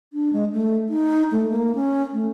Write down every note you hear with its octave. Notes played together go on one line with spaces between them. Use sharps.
D4
G#3
A3
D#4
A3
A#3
C#4
A3